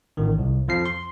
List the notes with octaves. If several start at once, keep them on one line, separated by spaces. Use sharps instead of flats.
A1 D#3
C2
F2 F3 C7
C6